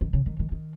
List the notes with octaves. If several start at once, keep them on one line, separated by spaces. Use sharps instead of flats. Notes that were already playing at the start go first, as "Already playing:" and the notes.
D#3
C#3
D#3
D#3
D#3